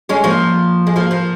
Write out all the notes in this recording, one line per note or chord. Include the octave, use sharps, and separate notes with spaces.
G#3 C#4
F3 A#3
G#3
F3 A#3
F3 A#3